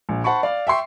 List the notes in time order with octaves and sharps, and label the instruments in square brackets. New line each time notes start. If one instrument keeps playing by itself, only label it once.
[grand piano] A#1
C5 F#5 A5 B5 C#6
D5 F5
E5 G5 C6 C#6